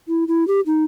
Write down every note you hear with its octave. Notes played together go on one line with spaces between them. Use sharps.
E4
E4
G4
D#4